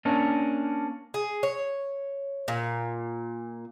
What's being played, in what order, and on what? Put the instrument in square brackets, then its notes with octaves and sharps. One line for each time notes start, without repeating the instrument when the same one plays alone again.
[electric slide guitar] A#3 C#4 D4
[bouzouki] G#4
C#5
A#2